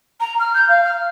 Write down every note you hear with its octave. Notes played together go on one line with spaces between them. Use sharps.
A#5
F6
G6
F5
F6